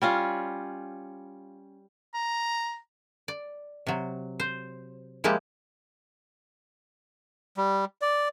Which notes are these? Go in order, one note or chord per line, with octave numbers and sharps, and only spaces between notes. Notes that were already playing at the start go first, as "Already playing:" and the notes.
G3 C#4 F4
A#5
D5
C3 F#3
C5
F3 G#3 A#3 E4 G4 A5
G3
D5